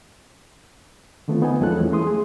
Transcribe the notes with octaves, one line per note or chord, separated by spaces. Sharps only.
D3 D#3 A3 B3 C4 F4
B3 D#4 D#5 G#5
E2 F3 G#3 C#4 A4 F#6
E3 F3 G#3 A3 C#4
A3 E4 G#4 C6 D#6
G#4